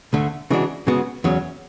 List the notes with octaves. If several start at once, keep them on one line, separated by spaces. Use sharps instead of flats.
D2 D3 A3
C#3 E3 G#3 D4 F#4
C#3 G#3 B3 F#4
E2 C#3 F#3 C#4